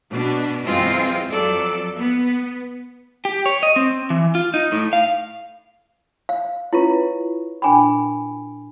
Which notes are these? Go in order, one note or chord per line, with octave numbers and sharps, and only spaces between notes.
B2 D4
F#2 E3 G#3 C4 F4
F2 F#3 A4 D5
B3
G4
C#5
D#5
C4
E3
F4
D#4
A2
F5
F5
C#4 E4 F4 B4 C#5
A#2 D4 G5 G#5 B5